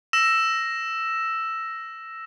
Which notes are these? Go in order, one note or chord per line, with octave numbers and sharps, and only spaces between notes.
E6 A#6 E7